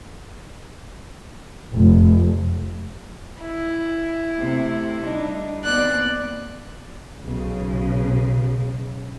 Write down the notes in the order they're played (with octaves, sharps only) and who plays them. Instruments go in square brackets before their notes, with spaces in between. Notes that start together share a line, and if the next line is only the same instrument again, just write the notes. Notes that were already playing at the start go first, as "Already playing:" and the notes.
[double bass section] F1
[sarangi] E4
[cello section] C3 A3
G3 D4 D#4
[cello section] D#2 B3 C4 [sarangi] D5 [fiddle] F#6
[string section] B1 C#3